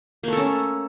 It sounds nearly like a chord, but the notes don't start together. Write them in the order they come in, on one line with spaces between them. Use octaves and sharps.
A#3 A3 A4 C#4